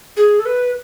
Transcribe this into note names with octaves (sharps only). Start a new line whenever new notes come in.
G#4
A4
B4